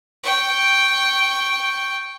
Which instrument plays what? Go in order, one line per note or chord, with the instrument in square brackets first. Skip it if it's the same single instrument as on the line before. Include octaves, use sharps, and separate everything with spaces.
[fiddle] G5 C#6